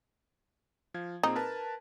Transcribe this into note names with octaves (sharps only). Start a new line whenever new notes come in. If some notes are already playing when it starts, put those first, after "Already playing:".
F3 F5 G#6
A#2 C4 D#4 G#4
A#4 B4 A5